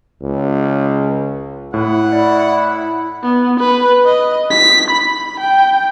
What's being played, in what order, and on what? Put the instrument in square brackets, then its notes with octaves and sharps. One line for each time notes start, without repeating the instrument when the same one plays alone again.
[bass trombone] C#2
[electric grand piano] A2 [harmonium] E4 [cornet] F#5
[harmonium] E4 [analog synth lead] D5
[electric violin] B3
B4
D#5
B6
B5
G5